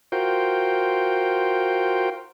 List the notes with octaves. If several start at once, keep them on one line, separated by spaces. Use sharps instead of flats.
F4 F#4 A#4 C5 G5